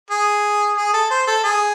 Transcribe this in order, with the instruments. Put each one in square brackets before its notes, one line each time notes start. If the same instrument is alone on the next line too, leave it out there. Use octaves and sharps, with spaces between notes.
[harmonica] G#4
G#4
A4
C5
A4
G#4